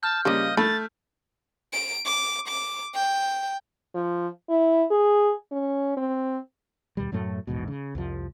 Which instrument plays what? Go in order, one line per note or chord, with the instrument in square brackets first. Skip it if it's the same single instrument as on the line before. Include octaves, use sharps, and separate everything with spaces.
[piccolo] A5 [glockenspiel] F6 G6
[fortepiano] C#3 G3 [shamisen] F3 A#3 [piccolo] D#5
[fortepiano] A3 [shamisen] B5 [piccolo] A6
[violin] D7
D6
D6
G5
[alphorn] F3
E4
G#4
C#4
C4
[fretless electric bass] D#2 B2 G3
F#2 A2 F#3 A3
A#1 E2 G#2 B2
C#3
C2 F2 F3